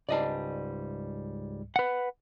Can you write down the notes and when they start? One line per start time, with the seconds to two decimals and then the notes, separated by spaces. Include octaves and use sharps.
0.09 C#2 G#2 G3 D5 D#5 A5
1.76 B4 F#5